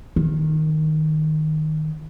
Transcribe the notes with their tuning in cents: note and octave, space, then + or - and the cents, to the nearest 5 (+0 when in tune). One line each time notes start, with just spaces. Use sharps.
D#3 -5